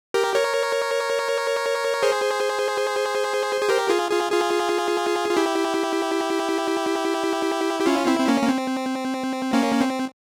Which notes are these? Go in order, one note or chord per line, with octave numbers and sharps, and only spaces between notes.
G4 A#4
A#4 C#5
G#4 C5
G#4
G4 A#4
F4 G#4
F4 G#4
F4 G#4
F4
E4 G4
G4
C#4 F4
C4 E4
C4
A#3 C#4
A#3
C4
A#3 C#4
C4